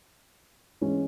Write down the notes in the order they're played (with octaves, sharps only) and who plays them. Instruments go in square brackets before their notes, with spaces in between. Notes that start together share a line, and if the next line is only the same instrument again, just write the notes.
[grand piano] E3 G#3 C#4